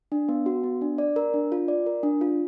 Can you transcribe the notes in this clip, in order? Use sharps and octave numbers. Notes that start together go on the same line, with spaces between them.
D4
B3
F#4
B3
D4
D5
A#4
D4
F4
D5
A#4
D4
F4